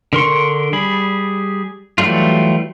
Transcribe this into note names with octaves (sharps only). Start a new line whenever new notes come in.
D3 A#4 C6 C#6
G3 G#4 B5
E3 F#3 G3 A3 F4